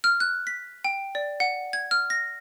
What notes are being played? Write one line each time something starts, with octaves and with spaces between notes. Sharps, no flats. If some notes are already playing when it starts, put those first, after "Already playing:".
F6
F#6
B6
G5
D5
F#5
G#6
F6
A#6